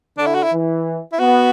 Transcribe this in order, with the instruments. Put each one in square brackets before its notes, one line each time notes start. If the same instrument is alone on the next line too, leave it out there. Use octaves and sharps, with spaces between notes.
[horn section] D3 [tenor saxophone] D4
[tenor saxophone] E4
F#4
E4
[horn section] E3
[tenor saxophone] E4
[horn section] B3 [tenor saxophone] F#4